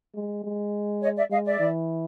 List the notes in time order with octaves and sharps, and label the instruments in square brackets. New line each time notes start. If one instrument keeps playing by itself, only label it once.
[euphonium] G#3
G#3
[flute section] C#5 D#5
D5 E5
[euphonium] G#3 [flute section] D#5 F5
[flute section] D5 E5
[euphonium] E3